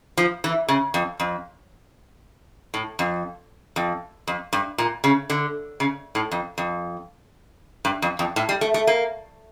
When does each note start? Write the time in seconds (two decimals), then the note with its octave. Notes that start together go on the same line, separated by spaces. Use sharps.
0.18 F3
0.44 E3
0.68 C#3
0.94 F2
1.20 F2
2.74 A2
2.99 F2
3.76 F2
4.27 F2
4.53 G2
4.78 A#2
5.04 C#3
5.30 D3
5.80 C#3
6.15 A2
6.32 F2
6.58 F2
7.85 G2
8.02 F2
8.19 F2
8.36 A2
8.49 G3
8.61 A3
8.74 A3
8.87 A#3